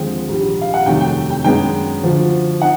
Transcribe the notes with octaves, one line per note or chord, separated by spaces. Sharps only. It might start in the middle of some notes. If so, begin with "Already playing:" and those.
Already playing: D#2 D3 F3 G#3 C4 G5
A#1 G#2 D#3 G3
F5
F#5
F1 D#2 D#3 F#3 A3 G5
G5
G5
F#2 D#3 G#3 B3 D4 G5
D2 D3 F3
D#4 F#5